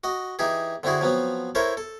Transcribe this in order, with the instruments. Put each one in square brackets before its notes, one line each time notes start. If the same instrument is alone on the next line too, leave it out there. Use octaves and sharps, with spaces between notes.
[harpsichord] F#4 D#5
E3 D#4 G4 G#4
D3 C4 E4 F#4 G#4
F3 F#3 B3 C4
E4 A4 A#4 C5 C#5
A4